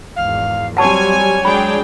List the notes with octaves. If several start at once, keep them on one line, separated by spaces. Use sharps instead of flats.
G#1 E2 F5
F#3 G3 C4 C#5 F#5 G#5 A5 C#6
F#3 G#3 D4 G#4 G5 B5